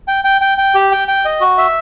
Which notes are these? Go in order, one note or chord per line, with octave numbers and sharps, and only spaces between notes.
G5
G5
G5
G5
G4
G5
G5
D#5
F#4
E5